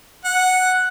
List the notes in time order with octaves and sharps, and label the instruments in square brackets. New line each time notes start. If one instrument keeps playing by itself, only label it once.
[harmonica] F#5